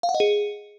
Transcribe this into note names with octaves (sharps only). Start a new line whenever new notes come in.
F5
F#5
D#5
G#4